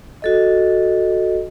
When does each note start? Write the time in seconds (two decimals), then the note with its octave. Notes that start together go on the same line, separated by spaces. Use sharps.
0.22 F#4 A4 D#5